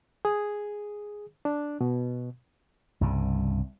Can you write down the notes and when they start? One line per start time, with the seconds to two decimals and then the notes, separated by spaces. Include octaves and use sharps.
0.25 G#4
1.45 D4
1.81 B2
3.01 C2 G2 C#3